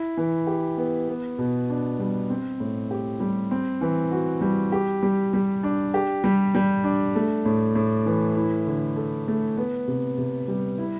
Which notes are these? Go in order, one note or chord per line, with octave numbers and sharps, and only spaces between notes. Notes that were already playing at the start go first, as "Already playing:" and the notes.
Already playing: E4
E3
G4
B3
B3
B2
D4
G3
C4
A2
G4
G3
C4
E3
F#4
G3
G4
G3
G3
D4
G4
G3
G3
D4
A3
A2
A2
E3
E4
D3
A4
A3
B3
C3
C3
G3
E4